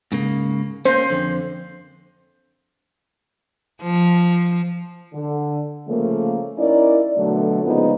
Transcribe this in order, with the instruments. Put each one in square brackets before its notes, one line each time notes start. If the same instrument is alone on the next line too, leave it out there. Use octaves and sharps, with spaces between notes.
[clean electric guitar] G#2 C#3 A#3
[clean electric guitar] A#3 C#4 [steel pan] C5
[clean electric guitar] F2 D3
[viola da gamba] F3
[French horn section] D3
C#3 F3 A3 A#3
C#4 D#4 E4 A#4 D5
B2 D3 F#3 A3
A#2 C#3 F3 G#3 B3 D#4